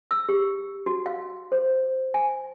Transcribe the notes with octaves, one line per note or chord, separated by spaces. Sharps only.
E6
G4
F#4
F5
C5
G#5